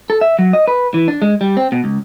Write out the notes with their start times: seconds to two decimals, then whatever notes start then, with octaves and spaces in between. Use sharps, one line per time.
0.10 A4
0.21 E5
0.39 F#3
0.53 D#5
0.68 B4
0.94 E3
1.08 D4
1.22 G#3
1.41 G3
1.57 C4
1.72 B2
1.84 C#2